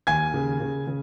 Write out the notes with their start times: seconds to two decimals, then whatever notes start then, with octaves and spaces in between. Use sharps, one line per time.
0.07 D#2 G#5 G#6
0.34 C#3
0.60 C#3
0.87 C#3